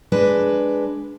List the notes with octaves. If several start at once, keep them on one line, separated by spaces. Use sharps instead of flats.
G#3 D4 B4